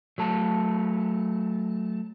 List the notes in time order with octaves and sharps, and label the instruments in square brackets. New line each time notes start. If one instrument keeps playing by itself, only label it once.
[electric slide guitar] F#3 A3 A5